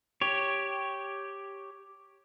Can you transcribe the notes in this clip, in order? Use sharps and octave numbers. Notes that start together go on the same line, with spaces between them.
G4 C#5